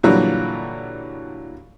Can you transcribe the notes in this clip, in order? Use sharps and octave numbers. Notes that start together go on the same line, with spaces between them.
A#2 D3 E3 F#3 G3